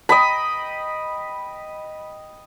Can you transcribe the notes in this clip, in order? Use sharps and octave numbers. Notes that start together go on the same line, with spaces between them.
D#5 G5 B5